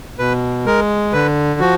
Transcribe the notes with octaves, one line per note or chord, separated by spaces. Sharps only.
B2 B4
G#3 A#4
D3 B4
F3 F#4